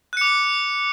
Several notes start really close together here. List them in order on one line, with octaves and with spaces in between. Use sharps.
F#6 C#7 D6